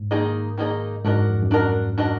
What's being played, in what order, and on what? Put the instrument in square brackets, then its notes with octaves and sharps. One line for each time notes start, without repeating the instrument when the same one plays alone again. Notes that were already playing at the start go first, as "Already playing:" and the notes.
Already playing: [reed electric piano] G#2
[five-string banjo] D#3 A#3 D#4 G#4 D#5
D#3 A#3 D#4 G#4 D#5
[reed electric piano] G#2 [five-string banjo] D4 F#4 A#4 D#5
[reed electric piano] F#2
F2
F#2
[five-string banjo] D4 F#4 A#4 D#5
D4 F#4 A#4 D#5